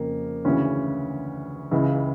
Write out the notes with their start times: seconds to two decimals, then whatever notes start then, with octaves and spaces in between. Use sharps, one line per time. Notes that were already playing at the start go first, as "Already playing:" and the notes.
Already playing: F2 C#3 F3 A#3
0.45 D2 C#3 E3 C#4
1.71 C#2 C#3 E3